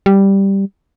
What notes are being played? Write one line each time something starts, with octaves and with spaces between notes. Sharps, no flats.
G3